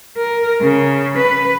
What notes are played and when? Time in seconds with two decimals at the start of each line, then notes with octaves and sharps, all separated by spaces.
0.18 A#4
0.62 C#3
1.18 B4